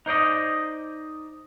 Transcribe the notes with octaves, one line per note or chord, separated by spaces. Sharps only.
D#4 C5 D5 D#5